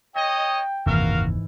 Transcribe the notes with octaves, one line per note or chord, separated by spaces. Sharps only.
C#5 D#5 G5 A#6
F#1 D#2 G#2 C3 E3 F#4 A#4 F5